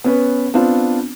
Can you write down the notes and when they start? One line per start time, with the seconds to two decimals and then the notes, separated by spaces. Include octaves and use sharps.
0.04 B3 C#4 B4
0.54 B3 C4 D4 F4